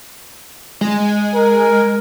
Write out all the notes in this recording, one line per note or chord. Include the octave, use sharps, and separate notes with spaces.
G#3
A#4